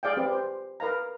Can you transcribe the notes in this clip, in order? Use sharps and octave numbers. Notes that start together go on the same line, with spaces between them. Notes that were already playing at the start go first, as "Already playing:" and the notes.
G#4 D5 F5 G5
C4 G4 B4
C5
A#4 B4 F5 A#5